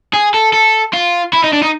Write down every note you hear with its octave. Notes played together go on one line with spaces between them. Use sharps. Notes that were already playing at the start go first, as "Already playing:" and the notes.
G#4
A4
A4
F4
E4
D#4
D4
D#4